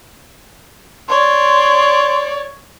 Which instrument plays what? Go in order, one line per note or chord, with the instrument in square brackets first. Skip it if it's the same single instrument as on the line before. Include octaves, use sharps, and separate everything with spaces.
[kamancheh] C#5 D5 [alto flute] C6